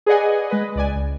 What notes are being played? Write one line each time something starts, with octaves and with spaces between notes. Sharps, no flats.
G#4 B4 D5 D#5 F#5 G#5
G#3 B4 D#5
C#2 D5 G#5
C#2